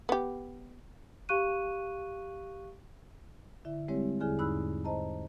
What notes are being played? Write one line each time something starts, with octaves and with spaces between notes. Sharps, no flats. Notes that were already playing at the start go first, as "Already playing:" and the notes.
B3 G4
G4 F5 C#6 F#6 D#7
D3 E4 E5
G3 G#3 C4 E4 G4 C#5
E2 D3 E4 G#4 G#5 F6
E2 G#2 D#4 B5 E6 F#6
C5 D#5 A5 A#5